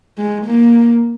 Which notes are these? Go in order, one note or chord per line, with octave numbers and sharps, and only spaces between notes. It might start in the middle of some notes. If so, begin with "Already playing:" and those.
G#3
A#3